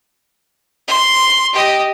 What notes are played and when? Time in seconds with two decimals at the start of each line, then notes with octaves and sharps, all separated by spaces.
0.88 C6
1.53 G4 D#5